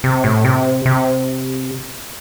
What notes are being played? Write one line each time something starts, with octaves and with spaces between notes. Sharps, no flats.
C3
A2
C3
C3